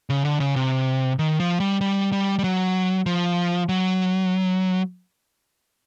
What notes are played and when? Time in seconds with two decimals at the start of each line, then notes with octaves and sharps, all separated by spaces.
0.10 C#3
0.25 D3
0.40 C#3
0.56 C3
1.19 D#3
1.40 F3
1.60 G3
1.81 G3
2.12 G3
2.39 G3
2.44 F#3
3.06 F3
3.69 F#3